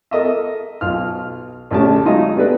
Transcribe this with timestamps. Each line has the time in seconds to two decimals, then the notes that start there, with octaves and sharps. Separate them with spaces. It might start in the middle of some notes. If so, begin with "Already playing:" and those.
0.11 A4 A#4 D#5 E5
0.81 B1 F4 F6
1.71 A#1 D3 A3 C#4 G4 A5
2.05 F#3 G#3 D#4 F4 D#5 E5
2.36 B3 D4 G4 A4 B4